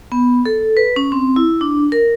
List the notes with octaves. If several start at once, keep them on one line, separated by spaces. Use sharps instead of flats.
B3
A4
B4
C#4
C4
E4
D4
A#4